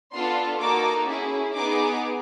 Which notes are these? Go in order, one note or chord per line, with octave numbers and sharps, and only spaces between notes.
B3 D4 F4 A4 C6
A#3 D#4 F#4 A4 D6
C#4 E4 G#4
B3 D#4 G#4 D6